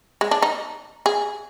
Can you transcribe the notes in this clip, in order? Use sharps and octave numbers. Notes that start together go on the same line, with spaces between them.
G#3
D4
D#4
G#4